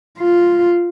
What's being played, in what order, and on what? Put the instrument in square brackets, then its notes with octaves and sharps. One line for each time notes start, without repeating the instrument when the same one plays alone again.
[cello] F4